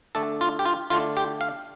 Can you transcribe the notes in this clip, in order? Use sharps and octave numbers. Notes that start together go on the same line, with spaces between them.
D3 A3 D4 A4
F4
G4
F4
D3 A3 D4 F4
G4
F5